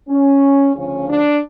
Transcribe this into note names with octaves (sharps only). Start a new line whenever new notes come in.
C#4
D2 C#3 F3 C#4
D4